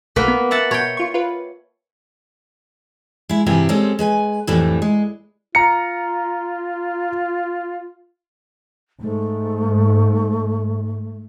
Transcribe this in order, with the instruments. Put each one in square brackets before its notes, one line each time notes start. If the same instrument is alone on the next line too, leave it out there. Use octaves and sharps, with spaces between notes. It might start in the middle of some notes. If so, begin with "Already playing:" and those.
[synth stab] B1 A3 [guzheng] A#3 F#4 B4
[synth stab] B3
[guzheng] E5 F#5 A5
[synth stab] B2 [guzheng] C#5 G5
[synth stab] F4 C#6
F4 B4
[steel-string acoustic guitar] G#3 E4
G2 C3 E3 E4 G4 G#4
G3 G#3 C4 C#4 A4
G#3 B4 G#5
F2 A2 E3 G3 A3 D4
G#3
[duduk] F4 [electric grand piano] A#5 C#7
[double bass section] G#2 [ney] A3